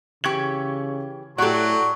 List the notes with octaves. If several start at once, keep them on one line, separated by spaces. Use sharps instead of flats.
C#3 E3 G4 C#6 G#6 F#7
A2 F#3 F#4 G4 A4 C#5 D5